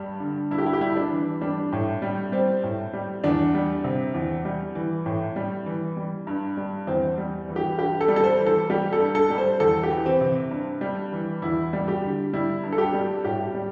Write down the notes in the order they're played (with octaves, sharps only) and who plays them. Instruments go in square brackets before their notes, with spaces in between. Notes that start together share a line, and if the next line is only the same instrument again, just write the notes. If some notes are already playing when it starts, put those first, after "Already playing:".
Already playing: [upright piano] G2 G3
D3
G2 E4
G4
E4
G4
G3 E4
D4
E3
G3 D4
A2
G3
G3 C4
A2
G3
E2 D4
G3
C3
E2
G3
E3
A2
G3
E3
G3
G2
G3
E2 C4
G3
E3
G4
G2 G4
A4
G3
A4
C5
E3
A4
G3 G4
A4
G2
A4
G3
C5
E2 A4
G4
E3
C4
C3
G2
G3
E3
E2 E4
G3
G4
D3
G3 E4
G2
A4
G4
G3
A2 G4
G3